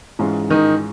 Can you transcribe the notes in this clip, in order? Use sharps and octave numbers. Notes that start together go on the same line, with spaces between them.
G#2 E3 G#3 C#4 F4
D#3 D#4